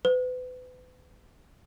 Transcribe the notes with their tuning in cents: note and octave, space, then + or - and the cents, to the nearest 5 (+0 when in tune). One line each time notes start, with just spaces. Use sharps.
B4 +35